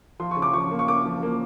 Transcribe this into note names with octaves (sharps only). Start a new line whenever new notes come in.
F3 C6
C#6
C#3
D6
F3 C#6
A#3
C#6
A#3 D6
F3
A#3